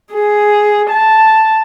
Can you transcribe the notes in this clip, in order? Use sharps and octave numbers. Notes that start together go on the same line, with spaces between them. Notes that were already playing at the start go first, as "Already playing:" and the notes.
G#4
A5